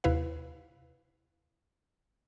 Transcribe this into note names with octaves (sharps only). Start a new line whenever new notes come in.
D#2 C3 E4 B4 F5